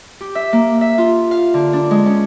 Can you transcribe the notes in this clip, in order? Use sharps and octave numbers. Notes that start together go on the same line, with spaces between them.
G4
E5
A#3
E5
F4
F5
D3
D4
G#3
C#4